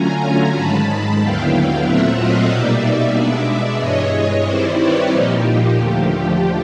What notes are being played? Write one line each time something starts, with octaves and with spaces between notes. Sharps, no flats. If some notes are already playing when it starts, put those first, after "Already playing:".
Already playing: D3 F#3 A3 C#4 F4 G#5 A#5
G#2 D#3 G#3 A5 B5
D#2 D3 F#3 B3 E4 F5 G5
A#2 F#3 A3 C4 F4 E5 F#5
D#5 F5
B2 G3 A#3 D#4 D5 E5
B2 G#3 B3 D4
G2 E3 G#3 C#5 D#5
D#3 G3 C4 E4 C5 D5
B4 C#5
A#2 F3 A#3 D#4 G4
G4
D#2 D3 F3 A3